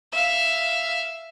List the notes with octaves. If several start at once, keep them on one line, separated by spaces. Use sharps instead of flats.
E5 F5